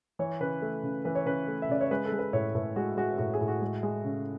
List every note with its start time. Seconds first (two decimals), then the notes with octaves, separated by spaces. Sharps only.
0.19 E3 C#5
0.40 C#3 B4
0.62 A3
0.83 C#3
1.05 E3 B4
1.15 C#5
1.26 C#3 B4
1.48 A3
1.62 E5
1.69 C#3 D5
1.81 C#5
1.91 G#3 B4
2.05 A4
2.12 G#3
2.19 B4
2.33 A2 C#5
2.55 A2 B4
2.76 G#3 F#4
2.97 G#3 F#4
3.18 A2 F#4
3.34 G#4
3.41 A2
3.48 F#4
3.61 G#3
3.83 G#3
4.04 C#3